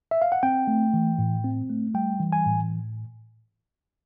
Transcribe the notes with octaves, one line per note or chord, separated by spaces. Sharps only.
E5
F5
F#5
C4 G5
A3
E3
A2
C4
A3
G3 G5
E3
G#5
A2